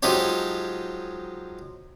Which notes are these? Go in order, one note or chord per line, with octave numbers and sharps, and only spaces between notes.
F3 F#3 G#3 D#4 G4 C#5